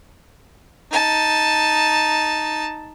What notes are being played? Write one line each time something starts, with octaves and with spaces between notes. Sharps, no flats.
D#4 A5